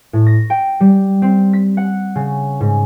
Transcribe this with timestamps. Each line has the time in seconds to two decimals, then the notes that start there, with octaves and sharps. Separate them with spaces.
0.13 A2
0.26 A#6
0.50 G5
0.80 G3
1.22 C4
1.53 B6
1.77 F#5
2.15 C#3
2.61 G#2